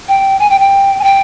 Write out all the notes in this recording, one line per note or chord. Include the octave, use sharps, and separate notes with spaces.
G5
G#5
G5
G5
G#5
G5